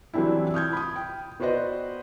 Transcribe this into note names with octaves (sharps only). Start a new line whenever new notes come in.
E3 F#3 G3 C4 D4 E4
D#6 F6 G6 G#6
B5 D#6
G5
B3 F#4 B4 C5 D5 D#5